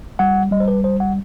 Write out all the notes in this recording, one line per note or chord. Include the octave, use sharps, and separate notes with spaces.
G3 F#5
G3 D#5
C5
B4
G1 C5
F#5